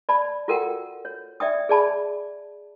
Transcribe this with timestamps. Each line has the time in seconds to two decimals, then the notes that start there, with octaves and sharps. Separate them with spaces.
0.09 D5 A5 B5
0.48 F4 F#4 A4 A#4 F#5 G5
1.05 C#5
1.40 D5 E5 G5 D#6
1.69 G#4 D5 A5 B5